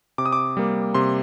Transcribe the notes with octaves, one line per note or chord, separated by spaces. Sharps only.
C3 D6
D#6
D6
G3 A#3
C3 C6